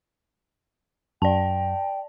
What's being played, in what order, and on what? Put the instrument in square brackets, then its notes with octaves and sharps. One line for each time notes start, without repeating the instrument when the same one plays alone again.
[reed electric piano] F#2 [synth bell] D5 A5 [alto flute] G5